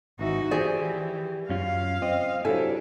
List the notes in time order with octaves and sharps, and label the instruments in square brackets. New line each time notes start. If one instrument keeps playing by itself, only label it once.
[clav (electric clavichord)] G#1 E3 E5 [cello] D#4 F#4
[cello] E3 [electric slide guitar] G4 D5 [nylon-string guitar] G#4 [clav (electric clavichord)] C5
[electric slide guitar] F#2 C#4 F4 [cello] F5
[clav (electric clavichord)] C4 [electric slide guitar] D#5
[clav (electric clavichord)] C3 F#3 [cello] D4 [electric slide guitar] E4 G#5 [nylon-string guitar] A4